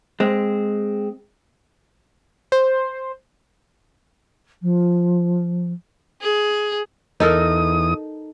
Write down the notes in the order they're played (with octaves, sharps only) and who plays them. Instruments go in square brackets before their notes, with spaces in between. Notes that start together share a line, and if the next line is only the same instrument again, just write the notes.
[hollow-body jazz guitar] G#3 C4
[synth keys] C5
[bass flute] F3
[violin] G#4
[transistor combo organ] E2 D#6 [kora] D#4 A4 A#4